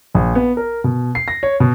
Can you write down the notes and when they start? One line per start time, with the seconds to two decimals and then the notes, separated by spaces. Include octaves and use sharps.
0.14 A#1
0.35 B3
0.57 A#4
0.84 B2
1.15 C7
1.28 A#6
1.43 C#5
1.60 B2